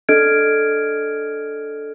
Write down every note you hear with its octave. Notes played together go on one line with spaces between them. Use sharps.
D4 A4 D#5 F6 G#6 D7